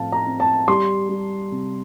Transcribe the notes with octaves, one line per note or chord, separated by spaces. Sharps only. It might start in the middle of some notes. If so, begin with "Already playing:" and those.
Already playing: A2 F3 C4 F5 A5
A#5
C4
A5
G3 C6
G3
C3